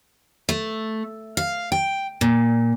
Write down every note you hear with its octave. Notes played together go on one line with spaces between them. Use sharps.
A3
F5
G5
A#2